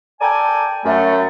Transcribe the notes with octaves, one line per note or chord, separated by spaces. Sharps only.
A4 A#4 D5 G5 G#5
F#2 A3